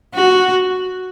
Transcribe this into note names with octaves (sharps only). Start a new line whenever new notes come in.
F#4